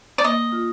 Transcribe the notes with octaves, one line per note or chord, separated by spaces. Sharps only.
D5
A#3 D#5
F4